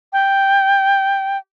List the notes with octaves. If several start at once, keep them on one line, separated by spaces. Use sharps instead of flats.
G5